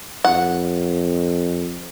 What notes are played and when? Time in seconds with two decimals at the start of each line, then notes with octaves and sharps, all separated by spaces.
0.25 F2 F#5